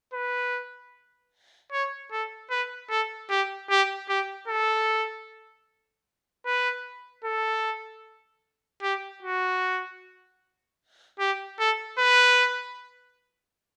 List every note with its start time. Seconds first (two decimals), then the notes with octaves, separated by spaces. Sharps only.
0.13 B4
1.72 C#5
2.12 A4
2.50 B4
2.90 A4
3.30 G4
3.70 G4
4.09 G4
4.48 A4
6.46 B4
7.24 A4
8.82 G4
9.23 F#4
11.20 G4
11.59 A4
11.98 B4